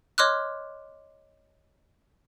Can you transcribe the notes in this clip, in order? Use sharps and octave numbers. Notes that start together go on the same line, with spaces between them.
C#5 D#5 C6 D6 F6 F#6